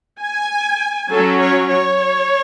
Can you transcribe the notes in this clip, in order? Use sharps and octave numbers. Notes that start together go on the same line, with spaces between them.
G#5
F#3 C#4 A4
C#5
C#5